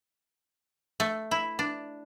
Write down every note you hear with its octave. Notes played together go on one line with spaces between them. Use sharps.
A3
E4
D4